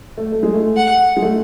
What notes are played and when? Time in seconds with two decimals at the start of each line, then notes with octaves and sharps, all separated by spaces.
0.18 A3
0.32 A3
0.43 G#3
0.54 A3
0.76 F#5
1.16 G#3
1.22 A3